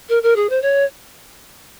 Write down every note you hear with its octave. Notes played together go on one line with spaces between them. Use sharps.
A#4
A#4
G#4
C5
C#5